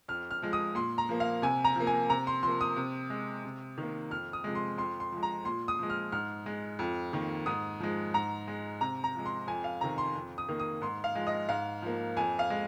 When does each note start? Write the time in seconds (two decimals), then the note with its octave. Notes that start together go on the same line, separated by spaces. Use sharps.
0.08 F2 F6
0.31 F6
0.42 F3 G#3
0.53 D#6
0.75 A#2 C6
0.98 A#5
1.09 F3 A#3
1.20 F5
1.42 C3 G#5
1.64 A#5
1.76 F3 A#3
1.87 G#5
2.09 C3 A#5
2.27 C6
2.43 F3 A#3 C6
2.61 D#6
2.76 C3
3.10 G#3
3.45 C3
3.78 D#3 A#3
4.10 F2 F6
4.33 D#6
4.44 C3 F3 G#3
4.55 C6
4.78 F2 C6
5.00 C6
5.12 F3 G#3
5.23 A#5
5.45 A#2 C6
5.68 D#6
5.79 F3 G#3
5.90 F6
6.12 G#2 F6
6.46 G#3
6.79 F2
7.13 D#3 A#3
7.46 G#2 D#6
7.80 F3 G#3
8.14 G#2 A#5
8.48 G#3
8.81 C3 A#5
9.04 A#5
9.15 F3 G#3
9.26 C6
9.47 F2 G#5
9.64 F5
9.81 C3 D#3 A#5
9.98 C6
10.15 F2
10.38 D#6
10.49 D#3 A#3
10.60 D#6
10.82 G#2 C6
11.04 F5
11.15 F3 G#3
11.27 D#5
11.49 G#2 F5
11.82 F3 A#3
12.17 F2 G#5
12.39 F5
12.50 G#3